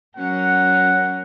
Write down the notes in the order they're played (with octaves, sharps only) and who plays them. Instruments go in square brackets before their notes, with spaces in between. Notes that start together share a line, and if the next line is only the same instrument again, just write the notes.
[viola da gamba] F#3 C#4 A#4 [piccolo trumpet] F#5